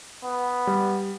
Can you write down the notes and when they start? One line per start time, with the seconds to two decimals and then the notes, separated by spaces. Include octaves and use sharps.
0.25 B3
0.67 G3